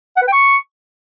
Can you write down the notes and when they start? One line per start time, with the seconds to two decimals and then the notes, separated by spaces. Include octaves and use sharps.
0.17 F#5
0.22 B4
0.28 G5
0.33 C#6